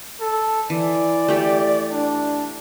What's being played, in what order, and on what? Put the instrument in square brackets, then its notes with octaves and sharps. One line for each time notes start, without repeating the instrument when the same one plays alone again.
[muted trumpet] A4
[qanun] E3 [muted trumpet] D5
[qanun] A3 G4
[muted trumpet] D4